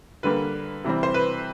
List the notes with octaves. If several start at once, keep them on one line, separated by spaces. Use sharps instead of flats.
D3 G3 A#3 B4
C3 E3 G3 C4
C5
B4